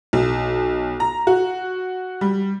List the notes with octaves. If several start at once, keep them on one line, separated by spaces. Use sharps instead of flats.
B1
A#5
F#4
G3